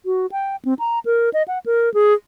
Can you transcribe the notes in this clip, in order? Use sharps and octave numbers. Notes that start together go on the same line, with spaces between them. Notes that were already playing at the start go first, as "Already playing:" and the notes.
F#4
G5
C4
A#5
A#4
D#5
F#5
A#4
G#4